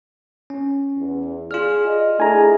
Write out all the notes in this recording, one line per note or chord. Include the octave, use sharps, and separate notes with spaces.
C#4
E2
F4 G#4 D5 F6
D#5
A3 D4 E4 G#4 G#5 A#5